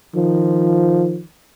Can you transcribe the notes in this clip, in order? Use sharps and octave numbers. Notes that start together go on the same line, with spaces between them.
D#3 F3